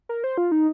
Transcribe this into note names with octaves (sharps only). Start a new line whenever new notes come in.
A#4
C5
F4
D#4